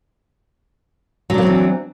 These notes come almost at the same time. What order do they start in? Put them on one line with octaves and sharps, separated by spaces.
F#3 D4 A#3 C4 E3